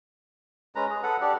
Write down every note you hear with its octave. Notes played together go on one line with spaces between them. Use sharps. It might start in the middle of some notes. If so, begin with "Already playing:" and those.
G#3 C#4 B4 A#5
G#4
A4 B4 F#5
D4 G4 D5